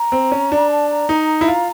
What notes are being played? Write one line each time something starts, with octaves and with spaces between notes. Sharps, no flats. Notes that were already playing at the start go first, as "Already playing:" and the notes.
Already playing: A#5
C4
C#4
D4
A5
A#5
D#4
E4
F4